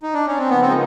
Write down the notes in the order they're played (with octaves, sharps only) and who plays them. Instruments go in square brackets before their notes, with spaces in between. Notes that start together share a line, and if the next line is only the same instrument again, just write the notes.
[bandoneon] D#4
D4
C#4
C4
[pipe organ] C#3 F3 A#3 D#4 [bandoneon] B3
[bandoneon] C4
G#3